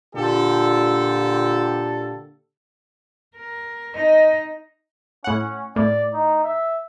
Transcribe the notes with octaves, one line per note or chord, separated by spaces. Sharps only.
A#2 D3 F4 G4 A4
A#4
D#4 D#5
A2 C#4 F#5
A2 D5
D#4
E5